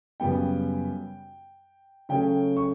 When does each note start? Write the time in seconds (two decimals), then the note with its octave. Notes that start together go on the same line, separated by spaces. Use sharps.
0.20 F#2 C#3 G3 B3 G5
2.09 C#3 F#3 A3 C#4 G5
2.57 C#6